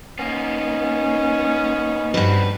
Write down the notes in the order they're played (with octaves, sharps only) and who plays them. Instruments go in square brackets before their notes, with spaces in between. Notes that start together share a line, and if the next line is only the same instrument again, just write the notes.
[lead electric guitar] A#3 B3 [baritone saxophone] C#4 [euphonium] D#4
[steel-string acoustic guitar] G2 B4 [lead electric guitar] C4 F#4